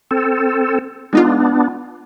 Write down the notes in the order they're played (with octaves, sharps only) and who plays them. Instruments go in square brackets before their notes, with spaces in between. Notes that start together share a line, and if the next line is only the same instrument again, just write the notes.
[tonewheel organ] C4 A4
[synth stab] G#3 D#4 F4 [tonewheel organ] B3 D4